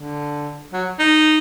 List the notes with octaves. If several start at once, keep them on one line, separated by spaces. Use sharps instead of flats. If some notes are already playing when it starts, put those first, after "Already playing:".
Already playing: D3
F#3
D#4